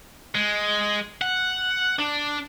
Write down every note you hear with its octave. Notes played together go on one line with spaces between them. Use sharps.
G#3
F#5
D4